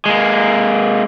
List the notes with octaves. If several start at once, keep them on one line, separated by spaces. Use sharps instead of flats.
G#3 A#3